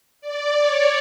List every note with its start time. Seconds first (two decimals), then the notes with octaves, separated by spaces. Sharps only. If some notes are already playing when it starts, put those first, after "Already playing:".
0.21 D5
0.58 C#5